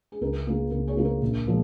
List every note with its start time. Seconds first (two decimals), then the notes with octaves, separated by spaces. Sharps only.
0.12 G#4
0.21 C#2 A#4
0.47 C#3 A#3 F4 G#4
0.71 C#2 A#4
0.88 G#4 C#5
0.97 C#3 A#3 F4
1.05 A#4
1.22 A#1
1.47 A#2 F3 G#3